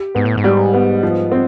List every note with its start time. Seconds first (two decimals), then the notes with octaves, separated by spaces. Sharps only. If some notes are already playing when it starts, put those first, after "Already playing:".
Already playing: G4
0.15 G#2 B3
0.25 A2
0.37 G#2
0.44 G3
0.73 B3
1.03 F3
1.32 C4